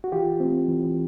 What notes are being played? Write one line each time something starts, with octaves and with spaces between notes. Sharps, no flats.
F#4
E3 F4 G4
A3 C4
E3